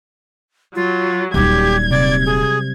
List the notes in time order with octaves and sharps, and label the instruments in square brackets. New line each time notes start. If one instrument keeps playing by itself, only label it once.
[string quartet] F#3 [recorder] F4
[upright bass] D#1 D#4 [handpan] F#3 G3 [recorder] G4 [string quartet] G#6
[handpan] C3 [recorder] D5
[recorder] G#4